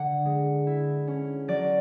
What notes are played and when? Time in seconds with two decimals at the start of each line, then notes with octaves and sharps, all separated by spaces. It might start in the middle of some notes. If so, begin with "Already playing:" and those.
Already playing: D3 F#5
0.25 G#3
0.67 E4
1.07 C#4
1.48 F#3 D5